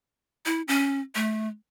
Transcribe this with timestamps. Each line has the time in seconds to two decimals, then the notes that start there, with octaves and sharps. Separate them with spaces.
0.45 E4
0.68 C#4
1.15 A3